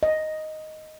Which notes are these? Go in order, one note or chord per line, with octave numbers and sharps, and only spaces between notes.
D#5